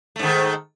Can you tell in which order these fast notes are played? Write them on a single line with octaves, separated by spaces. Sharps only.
A3 G#2 D#3